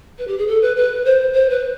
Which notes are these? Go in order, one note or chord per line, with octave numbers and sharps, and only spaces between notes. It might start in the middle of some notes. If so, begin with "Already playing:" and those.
B4
G4
G#4
A4
B4
B4
C5
C5
B4